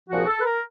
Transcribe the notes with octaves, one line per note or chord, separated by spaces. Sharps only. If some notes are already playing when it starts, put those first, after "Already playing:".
C2 A#2 F3 F#4
G#4
A4
B4
A#4